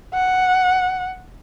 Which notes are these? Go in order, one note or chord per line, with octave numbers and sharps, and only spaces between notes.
F#5